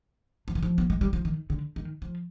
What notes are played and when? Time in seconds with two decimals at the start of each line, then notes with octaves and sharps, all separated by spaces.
0.48 F3
0.55 D#3
0.63 F3
0.78 B3
0.90 G#3
1.01 G3
1.13 F3
1.25 D#3
1.50 D3
1.76 D#3
2.02 F3